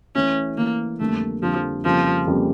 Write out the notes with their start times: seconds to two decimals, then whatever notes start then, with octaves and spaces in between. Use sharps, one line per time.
0.15 E3 A3 C#4 E4
0.57 E3 A3 A#3 E4
1.00 F2 D3 G3 A3 A#3
1.42 F2 D3 F3 G3 A#3
1.85 F2 C#3 F3 G3 A#3
2.27 F2 C#3 G3 A#3